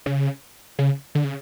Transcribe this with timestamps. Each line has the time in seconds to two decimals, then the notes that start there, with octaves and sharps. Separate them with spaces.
0.06 C#3
0.79 C#3
1.15 D3
1.24 C#3